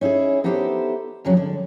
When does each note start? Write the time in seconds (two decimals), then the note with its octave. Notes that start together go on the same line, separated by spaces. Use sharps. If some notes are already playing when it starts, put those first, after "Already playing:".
0.01 C#4 D#4 E4 G4 G#4
0.44 B3 D#4 E4 G4 A4 C5
1.25 F2 C#3 F#3 G#3 C#4
1.37 D3